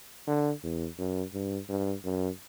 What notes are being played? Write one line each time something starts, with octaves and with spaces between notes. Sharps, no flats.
D3
E2
F#2
G2
G2
F#2